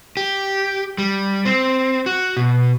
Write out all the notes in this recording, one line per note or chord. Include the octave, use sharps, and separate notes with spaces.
G4
G3
C4
F#4
B2